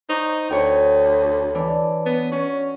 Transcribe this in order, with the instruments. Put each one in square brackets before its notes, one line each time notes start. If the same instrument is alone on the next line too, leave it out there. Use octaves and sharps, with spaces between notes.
[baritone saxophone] D#4 [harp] C5 C#6
[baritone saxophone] D2 [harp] F#4 C#5 G5
[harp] E3 D4
[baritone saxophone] B3
[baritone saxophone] C#4 [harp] F#4